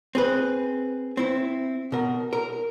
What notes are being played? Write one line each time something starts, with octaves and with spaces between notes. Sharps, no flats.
C4 G#4 B4
C4 E4
B2 A#4
A#4